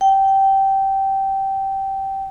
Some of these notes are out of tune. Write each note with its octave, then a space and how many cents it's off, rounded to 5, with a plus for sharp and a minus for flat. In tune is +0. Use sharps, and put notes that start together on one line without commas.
G5 -15